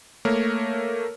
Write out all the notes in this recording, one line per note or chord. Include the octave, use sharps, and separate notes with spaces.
A3 A#3 A#4 C#5